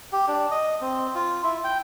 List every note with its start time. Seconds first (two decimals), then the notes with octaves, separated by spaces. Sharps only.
0.12 G4
0.28 D4
0.51 D#5
0.81 C4
1.15 F4
1.44 E4
1.64 G5